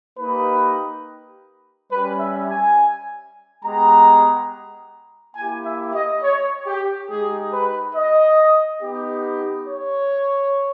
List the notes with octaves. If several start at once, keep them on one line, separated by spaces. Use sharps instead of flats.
A#3 D#4 G4 B4
G3 C#4 G4 B4
E5
G#5
G#3 B3 G4 A#5
A#3 E4 G4 G#5
E5
D#5
C#5
G4
G#3 D#4 G4 G#4
B4
D#5
B3 D#4 G4
C#5